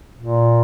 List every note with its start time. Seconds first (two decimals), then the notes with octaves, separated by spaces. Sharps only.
0.20 A#2